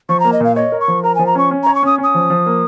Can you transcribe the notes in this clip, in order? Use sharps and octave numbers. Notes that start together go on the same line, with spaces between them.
F3 C#6
A#3 A#5
D#5
A#2 F5
C#5 D#5
A#4
C#6
F3
A#4 A#5
F3 G#5
A#5
C#4 C#6
C#4
C#5 A#5
C#6
C#4 D#6
C#4
D#6
F3
F3
A#3